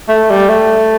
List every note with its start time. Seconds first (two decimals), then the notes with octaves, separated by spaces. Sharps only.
0.09 A3
0.30 G3
0.49 A3